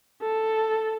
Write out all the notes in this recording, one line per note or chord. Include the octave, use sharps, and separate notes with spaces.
A4